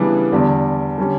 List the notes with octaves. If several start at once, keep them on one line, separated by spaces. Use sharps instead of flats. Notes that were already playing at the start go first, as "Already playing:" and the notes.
Already playing: C#3 E3 G3 B3 D4
E2 D3 G3
D3 G3 C#4